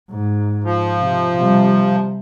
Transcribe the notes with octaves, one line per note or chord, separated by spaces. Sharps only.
G#2
F3
C3
C3 G3